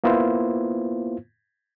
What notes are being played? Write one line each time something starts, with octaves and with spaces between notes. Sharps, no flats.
A#3 B3 E4 F4 C5